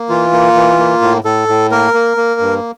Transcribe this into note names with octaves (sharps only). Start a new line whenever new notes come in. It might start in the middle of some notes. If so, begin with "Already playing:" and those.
Already playing: A#3
E3 F4
A#3
E3
A#3
A2
A2 A4
A2
A#3 A#4
A#3
A#3
G2